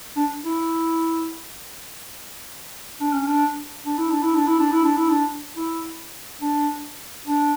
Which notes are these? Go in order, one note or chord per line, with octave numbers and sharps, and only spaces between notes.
D4
E4
D4
C#4
D4
D4
E4
D4
E4
D4
E4
D4
E4
D4
E4
D4
E4
D4
D4